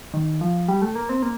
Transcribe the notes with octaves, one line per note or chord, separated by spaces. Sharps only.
D#3
F3
G3
A3
A#3
C4
A#3